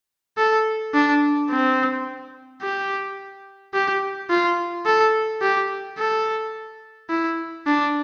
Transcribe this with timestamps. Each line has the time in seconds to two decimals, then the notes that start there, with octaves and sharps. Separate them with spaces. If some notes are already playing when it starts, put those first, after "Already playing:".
0.38 A4
0.94 D4
1.50 C4
2.62 G4
3.74 G4
4.30 F4
4.86 A4
5.42 G4
5.99 A4
7.10 E4
7.67 D4